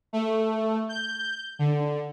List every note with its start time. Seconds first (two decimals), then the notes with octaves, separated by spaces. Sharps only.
0.13 A3
0.89 G6
1.59 D3